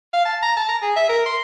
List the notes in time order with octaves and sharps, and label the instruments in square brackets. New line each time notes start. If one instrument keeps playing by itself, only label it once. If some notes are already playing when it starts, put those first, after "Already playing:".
[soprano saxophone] F5
A5
A#5
A5
A#5
G#4
E5
A#4
C6